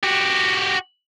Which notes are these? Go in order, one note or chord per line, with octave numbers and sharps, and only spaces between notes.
F#4 G4